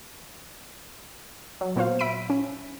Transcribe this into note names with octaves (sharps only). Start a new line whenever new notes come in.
F#3
A#2 B3 F#4 C5 F5
E5 B5 B6 D7 D#7
C#4